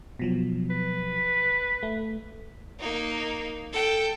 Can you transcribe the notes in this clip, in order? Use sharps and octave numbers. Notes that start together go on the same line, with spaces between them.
B2 F3 F#3
B4
A3
A#3 D#4
A4 G5